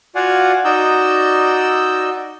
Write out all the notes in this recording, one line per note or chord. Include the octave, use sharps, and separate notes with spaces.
F4 F#4 D5 F5 F#5 G#5
D#4 F#4 D5 D#5 E6 G6